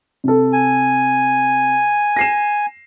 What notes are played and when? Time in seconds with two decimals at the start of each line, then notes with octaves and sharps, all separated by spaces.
0.24 C3 A4
0.53 G#5
2.16 A#6 C7 E7